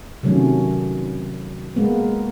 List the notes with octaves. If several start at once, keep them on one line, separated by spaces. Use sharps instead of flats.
C3 D#3 F#3 A3 C#4
G#3 A#3 B3